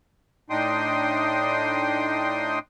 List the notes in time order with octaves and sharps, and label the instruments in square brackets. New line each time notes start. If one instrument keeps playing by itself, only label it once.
[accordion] A2 D4 D#4 G5 C6 D#6